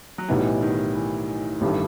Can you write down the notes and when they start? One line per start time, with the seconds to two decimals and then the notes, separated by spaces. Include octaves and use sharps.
0.18 F#3
0.28 B1 A2 E3 G3 B3 D#4
0.62 D#3
0.95 E3
1.61 A1 G2 D#3 A3